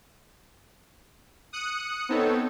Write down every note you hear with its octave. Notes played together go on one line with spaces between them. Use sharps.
D#6 F#6 C#7
B3 C4 D#4 A4 C#5